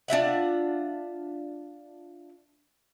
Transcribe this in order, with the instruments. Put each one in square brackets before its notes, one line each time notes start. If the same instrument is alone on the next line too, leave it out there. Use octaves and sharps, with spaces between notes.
[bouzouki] D4 F4 E5 F#5